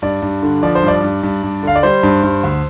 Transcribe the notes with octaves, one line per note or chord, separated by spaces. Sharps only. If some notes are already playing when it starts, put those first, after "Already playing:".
G2 D5
G2
D3
F3 D5
C5
G2
D5
G2
G2
G2
D3 F5
D5
G3 C5
G2
G2
D2